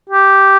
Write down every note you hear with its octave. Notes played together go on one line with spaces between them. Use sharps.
G4